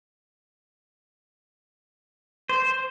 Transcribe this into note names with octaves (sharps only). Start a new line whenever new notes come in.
C5